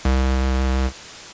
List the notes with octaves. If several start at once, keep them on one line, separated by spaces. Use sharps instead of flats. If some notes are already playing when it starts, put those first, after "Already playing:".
C2